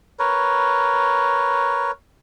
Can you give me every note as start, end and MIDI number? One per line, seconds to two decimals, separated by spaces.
0.19 1.91 70
0.19 1.91 71
0.19 1.91 73